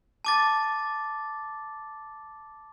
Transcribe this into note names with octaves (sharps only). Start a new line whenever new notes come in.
A5 D6 A6